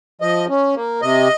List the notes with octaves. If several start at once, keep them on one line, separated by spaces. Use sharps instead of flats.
F3 D#5
C#4
A#3
C3 D#5